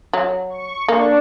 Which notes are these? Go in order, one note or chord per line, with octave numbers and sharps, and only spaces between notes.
F#3
C#6
A#3 D4